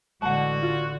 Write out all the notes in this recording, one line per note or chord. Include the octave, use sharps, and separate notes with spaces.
A1 D3 G#3 F#4 F#5 A5
F4